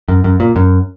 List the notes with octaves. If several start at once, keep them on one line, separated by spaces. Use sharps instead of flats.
F#2
F#2
A#2
F#2